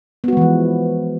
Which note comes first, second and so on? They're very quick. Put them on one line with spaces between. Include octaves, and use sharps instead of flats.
B3 F#4 G#3 E3 F3